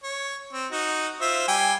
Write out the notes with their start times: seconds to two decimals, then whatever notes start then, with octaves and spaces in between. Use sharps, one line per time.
0.03 C#5
0.53 C4
0.72 D#4 F#4
1.21 F4 C5 E5
1.48 G3 G5 G#5